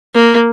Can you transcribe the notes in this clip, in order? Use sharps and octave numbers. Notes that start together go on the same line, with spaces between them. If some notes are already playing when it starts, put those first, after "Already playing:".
A#3